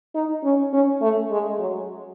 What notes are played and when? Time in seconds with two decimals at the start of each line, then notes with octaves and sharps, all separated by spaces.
0.15 D#4
0.44 C#4
0.73 C#4
1.01 A3
1.31 G#3
1.59 F#3